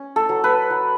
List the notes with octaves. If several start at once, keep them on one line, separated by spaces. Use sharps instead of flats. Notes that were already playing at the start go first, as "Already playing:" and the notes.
Already playing: C#4
A4
F#3
B4
F#3